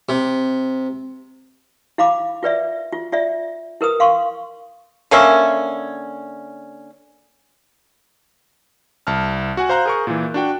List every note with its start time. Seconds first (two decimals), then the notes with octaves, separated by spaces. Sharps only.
0.09 C3
1.98 E4 F5 B5 D6
2.43 F4 B4 D5 E5
2.92 F4
3.12 F4 D5 E5
3.81 E4 A#4 B4 D#6
4.00 F5 C6 C#6
5.11 D3 A#3 C#4 E5
9.07 C2 A5 F6
9.57 F#4 F#5 G#5
9.69 C5 F5 A#5 F#6 G6
9.85 G#4 A#4 C#6
10.07 A#2 E3
10.34 D4 F#4 G5